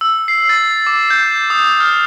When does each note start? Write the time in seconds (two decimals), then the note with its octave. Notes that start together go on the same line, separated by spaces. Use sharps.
0.01 E6
0.28 C7
0.49 A6
0.87 D6
1.10 G6
1.50 D#6
1.80 F6